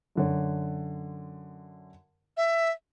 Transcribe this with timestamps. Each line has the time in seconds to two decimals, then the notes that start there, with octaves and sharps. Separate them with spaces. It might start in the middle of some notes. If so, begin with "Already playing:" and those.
0.15 F#2 D3 C#5
2.37 E5